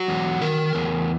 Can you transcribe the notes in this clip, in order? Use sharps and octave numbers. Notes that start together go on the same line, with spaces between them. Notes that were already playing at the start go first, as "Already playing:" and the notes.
Already playing: F#3 F#4
E2
D#3 A#4
E2